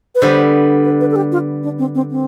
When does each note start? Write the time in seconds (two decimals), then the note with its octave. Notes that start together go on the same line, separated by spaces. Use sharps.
0.15 B4
0.22 D3 G3 B3 C5
0.84 B4
1.01 B4
1.11 A4
1.16 G4
1.32 F4
1.63 D4
1.79 C4
1.95 C4
2.11 C4